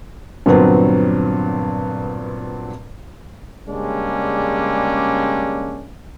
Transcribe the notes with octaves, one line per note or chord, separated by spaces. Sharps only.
G2 A#2 D3 F#3 B3 C4
C#3 G3 G#3 A#3 C#4 D4